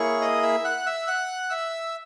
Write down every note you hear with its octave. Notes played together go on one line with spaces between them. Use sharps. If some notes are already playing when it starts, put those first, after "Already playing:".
Already playing: A#3 E4 G#4 C#5 C#6
D#5 D#6
E5 E6
F#5 F#6
E5 E6
F#5 F#6
E5 E6